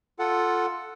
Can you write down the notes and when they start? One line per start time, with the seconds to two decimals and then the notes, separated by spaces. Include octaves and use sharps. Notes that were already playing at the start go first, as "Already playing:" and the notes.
0.19 F4 A4 F#5